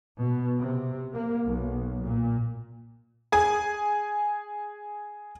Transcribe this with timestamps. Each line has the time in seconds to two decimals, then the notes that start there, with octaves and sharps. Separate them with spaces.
0.18 B2
0.59 C3
1.13 A#3
1.44 B1
2.03 A#2
3.32 G#4 G#5